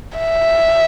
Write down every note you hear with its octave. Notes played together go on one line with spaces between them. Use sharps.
E5